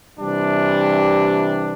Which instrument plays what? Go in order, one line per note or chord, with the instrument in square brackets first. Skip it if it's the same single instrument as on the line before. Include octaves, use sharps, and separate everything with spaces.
[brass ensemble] C3 E3 G3 D4